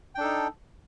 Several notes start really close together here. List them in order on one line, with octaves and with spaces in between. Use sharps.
G5 D4 A4 D#4